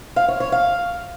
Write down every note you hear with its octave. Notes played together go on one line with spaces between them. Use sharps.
F5
C#5
C#5
F5